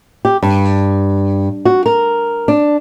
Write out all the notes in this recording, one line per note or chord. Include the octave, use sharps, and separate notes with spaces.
G4
G2
F#4
A#4
D4